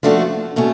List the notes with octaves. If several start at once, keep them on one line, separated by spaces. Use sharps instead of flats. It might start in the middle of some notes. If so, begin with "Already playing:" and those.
F3 A3 D4 F#4
B2 A3 C#4